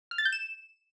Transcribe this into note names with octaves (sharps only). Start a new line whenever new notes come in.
F6
A6
G6
E7